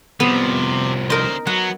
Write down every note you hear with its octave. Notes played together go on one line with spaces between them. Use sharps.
C2 C3 F3 B3
D3 D#4 A#4 C5
F#3 B3 F#5